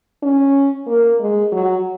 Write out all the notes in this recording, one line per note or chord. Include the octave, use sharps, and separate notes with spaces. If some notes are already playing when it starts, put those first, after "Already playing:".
C#4
A#3
G#3
F#3